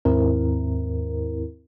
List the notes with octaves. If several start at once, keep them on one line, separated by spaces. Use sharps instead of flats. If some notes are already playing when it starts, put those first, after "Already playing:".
D#2 G#2 D#3 C4 E4 A#4